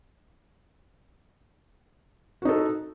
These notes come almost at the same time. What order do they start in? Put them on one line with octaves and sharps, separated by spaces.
F#4 D#4 A4